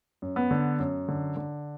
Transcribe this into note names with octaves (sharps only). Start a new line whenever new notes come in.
F#2
B3
D3
F#2
D3
D3